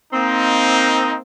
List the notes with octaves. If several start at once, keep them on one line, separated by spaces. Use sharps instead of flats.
A#3 C4 D#4